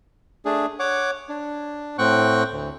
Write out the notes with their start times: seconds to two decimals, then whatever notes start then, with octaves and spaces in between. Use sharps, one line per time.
0.45 A3 D4 G#4
0.79 C#5 F#5 D6
1.29 D4
1.98 A2 C4 F#5 G5 C#6 F#6
2.51 D2